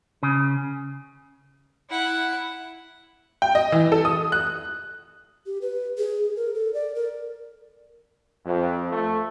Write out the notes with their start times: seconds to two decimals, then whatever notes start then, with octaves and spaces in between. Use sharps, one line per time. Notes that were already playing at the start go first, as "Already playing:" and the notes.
0.23 C#3
1.90 E4 F#5
3.42 G5
3.55 D#5
3.72 E3
3.92 A4
4.05 D#6
4.32 F#6
5.46 G4
5.62 B4
5.98 G#4
6.36 A#4
6.54 A4
6.74 D5
6.95 A#4
8.45 F2
8.92 A3